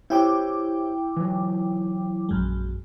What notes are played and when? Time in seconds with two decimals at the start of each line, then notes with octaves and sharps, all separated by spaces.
0.10 E4 G4 C5 C#5 G5 D6
1.16 E3 F#3
2.29 A#1 F#2 G#3